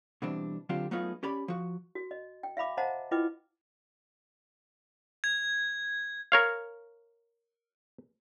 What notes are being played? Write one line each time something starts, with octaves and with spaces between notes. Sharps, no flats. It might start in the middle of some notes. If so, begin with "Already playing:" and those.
B2 E3 G3 C4 D4
D3 F#3 C4 D4 F4 G4
F#3 A3 B3 D#4 F4 G#4
C#4 G4 D5 B5
F3 F#4
F#4
D#5
G5
E5 F5 B5 D6
C5 D#5 F5 F#5 A5 A#5
E4 F4 B4 D#5 G5 D6
G#6
A#4 C#5 F5